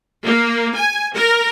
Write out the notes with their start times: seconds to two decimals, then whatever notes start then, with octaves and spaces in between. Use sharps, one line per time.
0.25 A#3
0.76 G#5
1.15 A#4